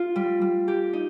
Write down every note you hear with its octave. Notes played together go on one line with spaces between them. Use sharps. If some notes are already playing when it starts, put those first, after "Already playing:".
Already playing: F4
G3
G3
G4
D#4